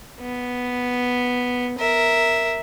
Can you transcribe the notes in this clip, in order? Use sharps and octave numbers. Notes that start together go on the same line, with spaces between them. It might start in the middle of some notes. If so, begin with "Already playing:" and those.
B3
A#4 E5